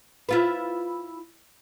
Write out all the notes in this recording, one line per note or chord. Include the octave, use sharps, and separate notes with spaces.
E4 F4 B4